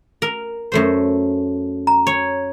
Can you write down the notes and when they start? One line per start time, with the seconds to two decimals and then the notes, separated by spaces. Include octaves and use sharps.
0.22 A#4
0.72 F#2 A3 C5
1.87 A#5
2.07 C#5